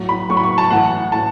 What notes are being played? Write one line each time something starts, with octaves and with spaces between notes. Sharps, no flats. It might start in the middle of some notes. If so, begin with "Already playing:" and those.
Already playing: A2 F#3
B5
A2 F#3 C#6
B5
C#6
A5
A2 E3 F#5
A2 A5